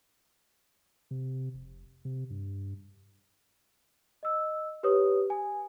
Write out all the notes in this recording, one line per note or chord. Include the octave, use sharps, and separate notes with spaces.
C3
F1
C3
G2
D#5 E6
G4 B4 C#5 D#6
G#5